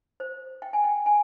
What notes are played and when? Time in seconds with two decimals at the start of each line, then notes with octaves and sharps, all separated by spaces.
0.20 C5
0.62 G5
0.73 G#5
0.84 G5
1.06 G#5